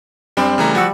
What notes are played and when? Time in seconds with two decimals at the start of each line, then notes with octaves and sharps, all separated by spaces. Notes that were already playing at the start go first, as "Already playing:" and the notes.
0.37 F#2 G3 C4 D4
0.58 C#3 E3 A3 A#5
0.75 F3 F#4 E6